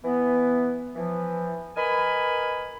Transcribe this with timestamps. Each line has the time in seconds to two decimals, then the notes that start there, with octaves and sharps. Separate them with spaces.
0.03 E3 B3
0.96 E3 F3
1.77 A#4 B4 D#5 G#5 B5